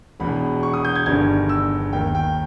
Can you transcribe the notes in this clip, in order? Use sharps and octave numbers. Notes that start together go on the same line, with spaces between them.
E1 E2 B2 B5
C#6
D#6
G6
G#6
G1 G2 D#3 G#6
E6
D#2 D#3 G5
G5